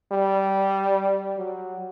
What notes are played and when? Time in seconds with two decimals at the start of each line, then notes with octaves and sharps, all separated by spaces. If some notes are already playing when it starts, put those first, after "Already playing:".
0.12 G3
1.38 F#3